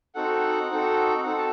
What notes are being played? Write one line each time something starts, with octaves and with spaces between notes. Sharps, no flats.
C4 D#4 F#4 A4 F#5
C4 D#4 F#4 A4
C4 D#4 F#4 A4 F#5
A5